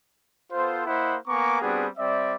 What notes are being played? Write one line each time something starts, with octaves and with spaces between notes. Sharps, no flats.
B3 F4 A4 C5
A#3 E4 C5 D#5 F#5 B5
A#3 B3 G#5 A#5 C#6 D6
G3 B3 C4 D4 F#4 G#4
G3 C4 D5 E5